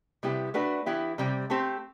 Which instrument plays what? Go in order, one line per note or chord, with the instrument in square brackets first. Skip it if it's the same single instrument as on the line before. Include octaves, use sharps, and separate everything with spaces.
[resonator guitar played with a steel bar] C3 G3 B3 E4 G4
A3 D4 F#4 B4
E3 B3 E4 G4
C3 G3 C4
A3 C4 G4 C5